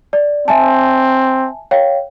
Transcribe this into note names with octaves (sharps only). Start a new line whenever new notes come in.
D5
C4 E5 G#5 A5
C#5 F5 G5